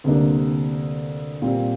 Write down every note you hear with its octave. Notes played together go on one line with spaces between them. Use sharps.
D2 C3 G3 A#3 D4
A#2 G3 C4